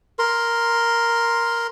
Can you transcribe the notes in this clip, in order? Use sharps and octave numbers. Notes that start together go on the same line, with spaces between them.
A#4 C6